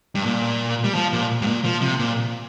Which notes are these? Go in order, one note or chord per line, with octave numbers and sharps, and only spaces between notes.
G2
A#2
G3
F3
A#2
G2
A#2
F3
C3
A#2